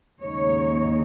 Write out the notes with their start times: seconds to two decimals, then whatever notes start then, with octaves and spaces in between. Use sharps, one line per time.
0.21 D#2 C#3 G#3 D#4 C#5